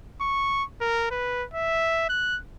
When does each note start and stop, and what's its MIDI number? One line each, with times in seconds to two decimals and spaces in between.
0.21 0.64 85
0.81 1.07 70
1.11 1.44 71
1.54 2.09 76
2.09 2.39 90